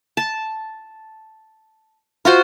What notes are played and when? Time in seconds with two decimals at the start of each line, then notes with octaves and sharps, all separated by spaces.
0.17 A5
2.25 F4 F#4 C5